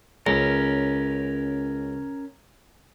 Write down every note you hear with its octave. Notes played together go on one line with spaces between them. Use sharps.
C#2 C#4 A#4